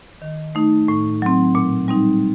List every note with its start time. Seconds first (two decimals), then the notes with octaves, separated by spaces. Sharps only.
0.22 D#3
0.55 A3 D#4
0.88 A2
1.22 F#3 C4
1.55 A#2
1.88 G3 C4 D#4